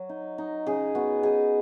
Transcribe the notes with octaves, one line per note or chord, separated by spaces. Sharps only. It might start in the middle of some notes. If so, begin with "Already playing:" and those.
Already playing: F#3
D#4
D#4
C#3 G#4
B3 F#4
D#4 G#4